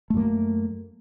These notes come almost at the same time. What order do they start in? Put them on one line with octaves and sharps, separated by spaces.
A3 F#2 A#3